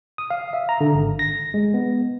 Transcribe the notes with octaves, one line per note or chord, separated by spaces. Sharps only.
D#6
F5
E5
A#5
D3
G#1
A#6
G#3
B3